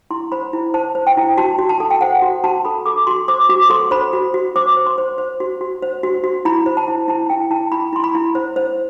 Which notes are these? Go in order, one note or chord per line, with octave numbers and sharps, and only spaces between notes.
E4 C6
C5 B5
E4
C5 A5
C5
G5
E4
F#4 A5
F#4
A5
A4
G5
C5 F#5
F#4
F#4 A5
A4 B5
A4 D6
F#4 C6
C5 D6
F#4 D6
A4 C6
C5 B5
F#4
F#4
C5 D6
C5
C6
C5
C5
F#4
F#4
C5
F#4
F#4
E4 B5
C5
A5
E4
E4 A5
E4 G5
E4 A5
E4 B5
E4 C6
B5
E4
C5
C5